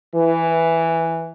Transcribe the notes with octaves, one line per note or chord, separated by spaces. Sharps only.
E3